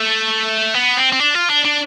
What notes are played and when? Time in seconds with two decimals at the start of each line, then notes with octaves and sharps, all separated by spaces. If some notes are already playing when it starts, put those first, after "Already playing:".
Already playing: A3
0.74 B3
0.97 C4
1.12 C4
1.20 D4
1.35 F4
1.50 D4
1.65 D4